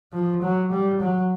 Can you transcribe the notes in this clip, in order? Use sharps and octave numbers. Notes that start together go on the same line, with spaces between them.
F3
F#3
G3
F#3